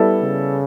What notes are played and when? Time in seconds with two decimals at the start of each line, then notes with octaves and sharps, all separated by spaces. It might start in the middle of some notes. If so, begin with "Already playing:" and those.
Already playing: G3 B3 E4 A4 D5
0.22 C#3